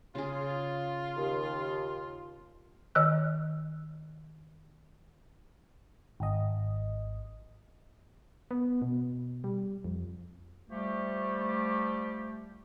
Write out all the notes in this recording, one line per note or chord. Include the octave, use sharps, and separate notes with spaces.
C#3 F4 G#4
D#2
D#3 D#5 E6 F#6
G#1 D#5
B3
B2
G3
F2
F3 G3 A3 G4